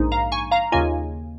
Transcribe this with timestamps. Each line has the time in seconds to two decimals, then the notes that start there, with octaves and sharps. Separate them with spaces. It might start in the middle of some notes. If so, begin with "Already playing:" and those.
Already playing: A#1 G#2 G#3 D#4
0.12 F5 A#5
0.32 G#5 C#6
0.51 F5 A#5
0.72 D#2 C#3 A#3 F4 D#5 G#5